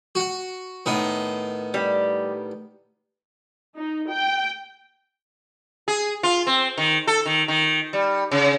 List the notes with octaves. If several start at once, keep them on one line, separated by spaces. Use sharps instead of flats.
F#4 F#5
A2 D#3 B3
G3
D#4
G5
G#4
F4
C4
D#3
A4
D#3
D#3
G3
C#3